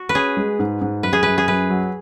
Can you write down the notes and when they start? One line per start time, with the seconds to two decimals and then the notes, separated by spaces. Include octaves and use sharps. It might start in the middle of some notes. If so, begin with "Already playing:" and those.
Already playing: F#4
0.09 B4
0.15 C#4 G#4
0.37 G#3
0.59 G#2
0.82 G#2
1.03 F#2 B4
1.13 G#4
1.23 F#2 B4
1.38 G#4
1.48 F#2 B4
1.70 F#3